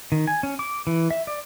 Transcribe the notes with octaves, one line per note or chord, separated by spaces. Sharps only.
D#3
G#5
C#4
D6
E3
E5
D5